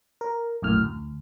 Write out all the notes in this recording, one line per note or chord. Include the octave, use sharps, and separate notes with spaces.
A#4
A#1 F#2 A2 F6
D2